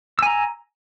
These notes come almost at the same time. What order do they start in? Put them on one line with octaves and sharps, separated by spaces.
E6 G#5 A#5